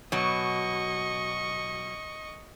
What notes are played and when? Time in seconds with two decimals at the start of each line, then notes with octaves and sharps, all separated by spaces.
0.12 B2 F#3 D#5 C#6